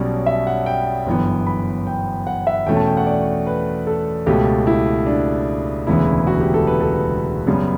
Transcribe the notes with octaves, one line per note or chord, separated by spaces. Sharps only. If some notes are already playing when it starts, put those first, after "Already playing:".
Already playing: B1 B2 G3 C#4 D5
E5
F#5
G5
G1 F#2 E3 B3
B5
G5
F#5
E5
E2 B2 A3 C#4 G5
A5
G5
F#5
D5
B4
A4
C#2 B2 A3 G4
E4
D4
E1 D2 C#3 E3 B3 E4
F#4
G4
A4
B4
A4
B4
F#2 C#3 G3 B3